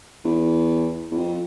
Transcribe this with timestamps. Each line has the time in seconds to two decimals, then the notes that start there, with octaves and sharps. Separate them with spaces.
0.25 E2
1.11 E2
1.17 F2